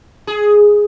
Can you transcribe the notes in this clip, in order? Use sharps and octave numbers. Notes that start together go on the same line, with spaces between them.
G#4